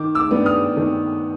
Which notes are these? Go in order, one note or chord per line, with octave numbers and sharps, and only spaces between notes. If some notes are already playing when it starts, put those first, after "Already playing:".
Already playing: D#3 D6
D6 E6
G3 B3 D4
D#6 F6
D#3